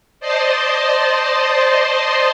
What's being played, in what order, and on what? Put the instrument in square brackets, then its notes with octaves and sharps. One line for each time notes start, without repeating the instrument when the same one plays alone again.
[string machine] C5 D5 D#5 A5 C6